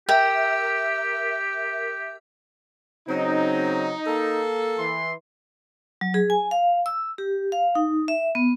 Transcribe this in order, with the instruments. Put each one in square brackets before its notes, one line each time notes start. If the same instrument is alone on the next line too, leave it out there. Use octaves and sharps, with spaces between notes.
[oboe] G4 [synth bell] A#4 E5 [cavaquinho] G5
[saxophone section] C#3 F#3 C4 [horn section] D#4
[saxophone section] A#3 A4
[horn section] E3 C6
[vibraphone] F#3
G#4
G#5
F5
E6
G4
F5
D#4
E5
B3